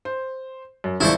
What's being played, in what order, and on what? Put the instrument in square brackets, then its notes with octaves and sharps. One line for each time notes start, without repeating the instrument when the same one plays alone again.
[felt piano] C5
F#2
[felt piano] E1 C#2 D5 [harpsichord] E4 C5 C#6